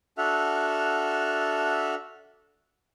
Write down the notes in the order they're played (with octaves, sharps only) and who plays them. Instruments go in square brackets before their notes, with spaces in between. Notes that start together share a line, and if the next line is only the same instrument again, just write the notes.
[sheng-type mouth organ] D4 F#4 A4 E5 F#5 F6